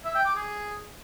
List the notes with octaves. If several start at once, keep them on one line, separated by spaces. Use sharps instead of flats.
E5
G5
D6
G#4